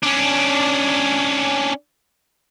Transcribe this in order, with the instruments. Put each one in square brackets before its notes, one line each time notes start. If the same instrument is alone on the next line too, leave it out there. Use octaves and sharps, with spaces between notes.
[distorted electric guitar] C#4 D4